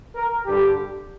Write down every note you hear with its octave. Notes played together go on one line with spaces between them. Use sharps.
A#4
G2 D3 G3 G4